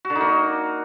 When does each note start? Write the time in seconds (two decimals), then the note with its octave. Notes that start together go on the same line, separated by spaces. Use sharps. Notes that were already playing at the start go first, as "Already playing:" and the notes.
0.05 F#4
0.10 D3
0.15 D#4
0.21 A#3